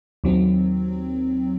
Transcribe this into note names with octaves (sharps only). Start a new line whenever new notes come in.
D#2 D#3 F#3 C4